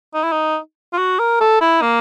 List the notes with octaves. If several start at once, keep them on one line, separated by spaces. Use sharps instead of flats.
D#4
E4
D#4
F4
F#4
A#4
A4
E4
A#3